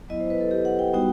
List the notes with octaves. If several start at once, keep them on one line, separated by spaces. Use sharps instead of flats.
F#3 B3 E4 D#5
C5
B4
A4
G4
F#5
G5
G3 B3 D#4 F#4 G5